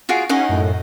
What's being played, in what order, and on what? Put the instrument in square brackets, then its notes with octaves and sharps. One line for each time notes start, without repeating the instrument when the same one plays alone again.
[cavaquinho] F4 F#4 G#4 [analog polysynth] D7
[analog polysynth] C#4 [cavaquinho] D#4 D#5 F#5
[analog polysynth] F#2 A2